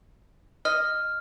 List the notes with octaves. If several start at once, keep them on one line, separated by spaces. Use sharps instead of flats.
D#5 F6